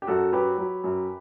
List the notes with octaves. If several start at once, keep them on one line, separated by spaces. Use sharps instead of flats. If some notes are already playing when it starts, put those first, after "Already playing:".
G4
F#2 F#4 A4
F#3 G4 B4
F#3
F#2